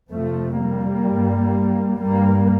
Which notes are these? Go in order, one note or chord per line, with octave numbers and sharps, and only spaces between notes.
F2 C3 F3 A3
G3 A#3
G2
G2 G3 A#3